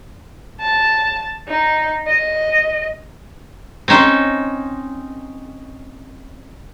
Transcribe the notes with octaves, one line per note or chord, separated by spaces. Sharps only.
A5
D#4
D#5
C4 C#4 D#4 C5